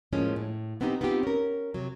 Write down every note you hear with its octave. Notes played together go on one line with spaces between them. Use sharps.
A2 F3 G#3 A#3 C#4
A2
F3 B3 C4 D4 D#4 G4
B3 C4 D#4 F4 G4
C#4 A#4
C3 F#3